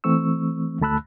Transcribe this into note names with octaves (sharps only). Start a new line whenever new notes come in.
E3 A3 C4 C#6 E6
D2 A3 A5 B5 E6 F#6